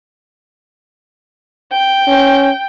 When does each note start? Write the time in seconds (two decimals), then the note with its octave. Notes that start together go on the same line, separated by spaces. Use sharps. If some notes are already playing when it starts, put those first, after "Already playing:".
1.71 G5
2.08 C#4